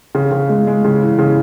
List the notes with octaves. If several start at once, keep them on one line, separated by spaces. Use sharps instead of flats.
C#3
C#3
G#3
G#3
C#3
E3
C#3